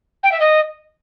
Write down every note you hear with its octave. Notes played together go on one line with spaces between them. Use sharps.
G5
E5
D#5